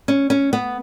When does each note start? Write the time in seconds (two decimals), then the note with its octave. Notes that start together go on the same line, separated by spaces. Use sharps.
0.08 C#4
0.30 C#4
0.53 B3